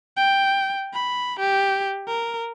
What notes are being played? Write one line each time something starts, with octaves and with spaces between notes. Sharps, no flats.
G5
B5
G4
A#4